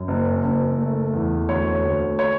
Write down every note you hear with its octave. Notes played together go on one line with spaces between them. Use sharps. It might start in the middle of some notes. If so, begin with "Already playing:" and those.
Already playing: F#2
F#1
F#1
A3
E2
D2 C#5
D2
C#5